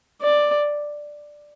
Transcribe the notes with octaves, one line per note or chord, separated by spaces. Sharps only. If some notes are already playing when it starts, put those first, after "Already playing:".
D5